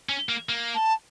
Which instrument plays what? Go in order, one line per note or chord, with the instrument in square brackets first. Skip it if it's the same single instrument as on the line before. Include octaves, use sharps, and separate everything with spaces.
[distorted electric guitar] C#4
A#3
A#3
[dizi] A5